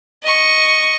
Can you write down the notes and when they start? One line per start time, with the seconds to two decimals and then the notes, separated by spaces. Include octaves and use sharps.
0.23 D#5 C#6